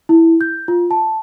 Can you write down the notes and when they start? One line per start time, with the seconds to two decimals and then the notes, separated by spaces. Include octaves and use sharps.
0.09 E4
0.41 G6
0.68 F4
0.91 A5